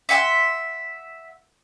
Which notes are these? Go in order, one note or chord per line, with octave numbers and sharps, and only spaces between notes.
E5 F#5 G5 C6